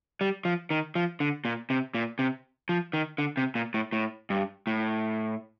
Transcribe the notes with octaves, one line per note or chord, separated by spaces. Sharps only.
G3
F3
D#3
F3
D3
A#2
C3
A#2
C3
F3
D#3
D3
C3
A#2
A2
A2
G2
A2